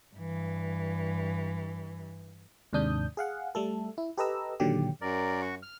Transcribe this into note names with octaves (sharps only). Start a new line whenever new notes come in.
G2 E3
D#2 G#2 C3 D4 D#6 G6
G#4 F5 F#5
G3 A3 A4
E4
G4 A4 B4 D#5 A#5 E6
A#2 D3 D#3 F#3 G4
F#2 A#4 D5
F#4 C#6
F6